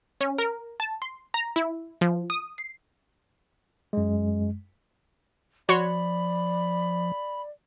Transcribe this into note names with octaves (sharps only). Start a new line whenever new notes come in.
C#4
A#4
A5
C6
A#5
E4
F3
D#6
C7
F#2 G#3
F3 F#4 C#5 D5 B5 C6